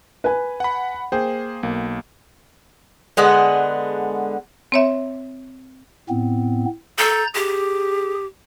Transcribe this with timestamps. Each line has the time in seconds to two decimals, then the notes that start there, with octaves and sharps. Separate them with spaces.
0.24 B4 G#5
0.60 F#5 B5
1.12 A#3 G#4 C5 G5
1.63 B1 A#3
3.17 D3 G#3 B3 F#5
4.72 C4 C#5 E5
6.09 A2 B3 C4
6.98 A4 A#5 G6 A6
7.35 G4 G#4